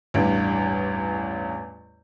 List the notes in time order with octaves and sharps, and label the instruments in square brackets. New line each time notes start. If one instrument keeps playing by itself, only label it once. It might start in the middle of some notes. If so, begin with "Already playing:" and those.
[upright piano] A1 E2 G2